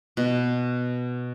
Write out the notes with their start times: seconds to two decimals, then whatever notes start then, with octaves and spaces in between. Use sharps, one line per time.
0.17 B2